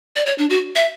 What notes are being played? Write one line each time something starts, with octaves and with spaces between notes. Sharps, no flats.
D5
C#5
D4
F#4
E5